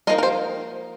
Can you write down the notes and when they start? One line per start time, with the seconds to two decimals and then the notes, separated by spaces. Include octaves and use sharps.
0.07 F3 A#3 D#4 A#4 D#5
0.18 A#4
0.23 G4 C5